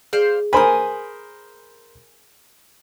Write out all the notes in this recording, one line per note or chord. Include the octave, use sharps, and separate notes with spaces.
G#4 C5 D5 F5
A#4 C5 G#5 B5 D#6